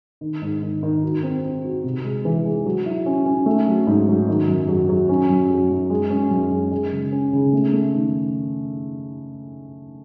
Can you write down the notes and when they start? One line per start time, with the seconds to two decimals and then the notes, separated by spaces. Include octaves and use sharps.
0.21 D#3
0.42 G#2
0.62 D#3
0.83 D#3
1.03 F#4
1.23 C4
1.44 C4
1.64 F#4
1.84 C3
2.04 G#3
2.25 E3
2.45 G#3
2.66 F#3
2.86 E4
3.06 C#4
3.26 C#4
3.46 A3
3.67 F#3
3.87 G#2
4.08 F#3
4.28 D#3
4.48 F#2
4.68 F#3
4.89 F#3
5.09 C#4
5.30 F#2
5.50 F#3
5.70 F#2
5.90 G#3
6.10 C#4
6.31 F#2
6.51 G#3
6.72 G#3
6.92 C#3
7.12 C#4
7.33 C#3
7.53 A3
7.73 A3
7.94 D#3